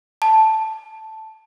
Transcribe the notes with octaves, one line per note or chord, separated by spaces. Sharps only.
A5